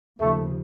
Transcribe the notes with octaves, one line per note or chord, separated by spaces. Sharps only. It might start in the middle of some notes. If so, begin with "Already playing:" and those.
D#2 C#3 F3 A3